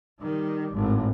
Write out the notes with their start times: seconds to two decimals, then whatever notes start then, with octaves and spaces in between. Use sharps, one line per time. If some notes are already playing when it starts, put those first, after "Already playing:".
0.21 D#3 G3
0.73 G#1 A2